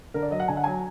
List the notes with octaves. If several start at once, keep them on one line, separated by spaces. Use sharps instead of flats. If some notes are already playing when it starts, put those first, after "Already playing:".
D3 A#4
D5
F#3 D#5
F#5
D3 G#5
F#5
F#3 G#5